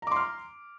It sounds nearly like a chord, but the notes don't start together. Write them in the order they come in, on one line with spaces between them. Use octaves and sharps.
A#5 D6 C6 F6